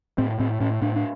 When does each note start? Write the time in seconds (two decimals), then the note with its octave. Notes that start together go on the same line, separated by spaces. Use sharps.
0.18 A2 C4
0.40 A2 C4
0.60 A2 C#4
0.82 A2 D4
0.96 D4